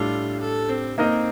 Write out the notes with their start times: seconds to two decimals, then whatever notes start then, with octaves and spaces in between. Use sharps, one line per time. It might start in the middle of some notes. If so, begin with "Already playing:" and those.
Already playing: A2 G3 D4 F4 A4
0.41 A4
0.69 C4
0.98 A#3 C4 D#4 A#4 D#5